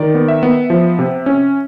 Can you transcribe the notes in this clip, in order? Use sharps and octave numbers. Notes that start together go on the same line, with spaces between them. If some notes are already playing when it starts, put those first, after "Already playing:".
Already playing: D#3 D5
B3
E5
B3
F3
C3
C#4